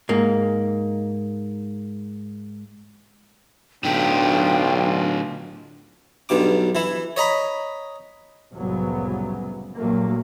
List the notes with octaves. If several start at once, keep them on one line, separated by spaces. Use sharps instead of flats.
G#2 A#3
B1 A2 D3 D4 F4 G5
B1 G2 B2 D6
E3 E4
C#5 D#5 A#5 B5
C2 F2 A2 C#3 F#3 B3
A#1 G2 A#2 F#3 A3 A#3